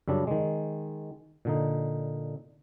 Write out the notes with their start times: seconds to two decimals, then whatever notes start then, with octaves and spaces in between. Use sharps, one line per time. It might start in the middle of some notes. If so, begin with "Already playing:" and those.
0.08 F#2 C#3 G3 D4
0.27 D#3 G#3
1.45 A#2 D3 D#4